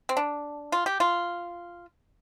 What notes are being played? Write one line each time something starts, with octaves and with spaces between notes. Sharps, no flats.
C4
D4
F4
G4
F4